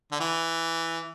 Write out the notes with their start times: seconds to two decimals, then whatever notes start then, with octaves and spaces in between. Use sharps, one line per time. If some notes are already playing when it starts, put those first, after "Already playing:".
0.12 D3
0.20 E3